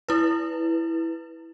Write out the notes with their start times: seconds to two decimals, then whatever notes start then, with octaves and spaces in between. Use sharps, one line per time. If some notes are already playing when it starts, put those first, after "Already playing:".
0.08 E4 B4